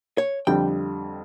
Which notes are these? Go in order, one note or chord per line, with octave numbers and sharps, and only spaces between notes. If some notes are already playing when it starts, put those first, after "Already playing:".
C#5
F2 D3 G3 G5